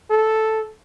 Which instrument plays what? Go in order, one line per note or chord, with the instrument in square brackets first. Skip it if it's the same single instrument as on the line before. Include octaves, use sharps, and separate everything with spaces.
[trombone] A4